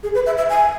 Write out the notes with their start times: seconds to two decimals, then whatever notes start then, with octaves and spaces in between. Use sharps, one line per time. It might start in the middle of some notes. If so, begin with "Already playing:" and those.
0.03 G#4
0.15 B4
0.26 E5
0.37 E5
0.50 G#5